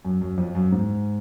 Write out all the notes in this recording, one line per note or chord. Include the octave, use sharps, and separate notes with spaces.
F#2
F#2
F2
F#2
G#2